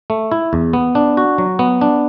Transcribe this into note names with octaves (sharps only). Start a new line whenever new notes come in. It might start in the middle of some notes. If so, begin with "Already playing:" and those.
A3
E4
E2
B3
D4
F#4
F#3
B3
D4